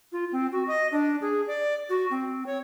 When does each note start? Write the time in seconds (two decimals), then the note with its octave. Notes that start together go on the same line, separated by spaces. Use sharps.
0.12 F4
0.32 C4
0.52 F#4
0.68 D#5
0.92 D4
1.22 G#4
1.47 D5
1.89 F#4
2.11 C4
2.46 C#5